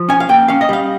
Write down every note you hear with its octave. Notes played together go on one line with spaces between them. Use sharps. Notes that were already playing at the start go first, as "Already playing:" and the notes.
Already playing: F3
C#4 G#5
F5
A#2 G5
C#4 F5
D#5
G3 F5